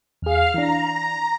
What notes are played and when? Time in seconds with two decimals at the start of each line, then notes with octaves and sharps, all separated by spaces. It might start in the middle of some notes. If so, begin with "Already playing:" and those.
0.22 E2 G#4 F5 F6
0.54 E3 D4 A#5